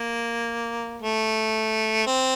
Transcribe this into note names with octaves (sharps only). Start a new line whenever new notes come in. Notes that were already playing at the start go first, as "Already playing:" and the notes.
Already playing: A#3
A3
C4